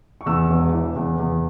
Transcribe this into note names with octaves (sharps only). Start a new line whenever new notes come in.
C#6
E2 E6
E1
E3
E2
E2